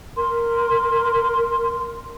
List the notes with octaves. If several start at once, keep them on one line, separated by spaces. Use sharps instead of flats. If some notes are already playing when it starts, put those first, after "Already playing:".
A#4 C6